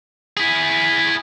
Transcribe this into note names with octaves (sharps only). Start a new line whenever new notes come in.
E4 G#4